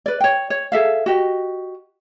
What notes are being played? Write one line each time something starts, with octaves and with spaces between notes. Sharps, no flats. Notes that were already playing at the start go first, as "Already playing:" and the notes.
B4 D5
C#5 G5
C#5
G#4 A4 E5 F5
F#4 G4 D#5